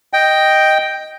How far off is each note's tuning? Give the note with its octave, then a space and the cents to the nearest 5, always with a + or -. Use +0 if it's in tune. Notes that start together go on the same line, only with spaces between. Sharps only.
D#5 +0 G5 +0